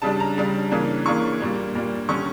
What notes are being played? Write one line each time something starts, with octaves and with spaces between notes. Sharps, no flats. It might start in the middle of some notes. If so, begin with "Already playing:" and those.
C#3 G3 D4 A5
A#5
C#3 G3 D4
C#3 E3 A#3 D4
C#3 E3 A#3 D4 C#6
A#2 G3 A#3 D4
A#2 G3 A#3 D4
D3 G3 C#4 C#6